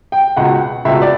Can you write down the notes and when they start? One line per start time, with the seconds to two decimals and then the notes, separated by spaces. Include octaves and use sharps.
0.12 G5
0.37 C#2 B2 F#5
0.85 C#2 B2 E5
1.02 D5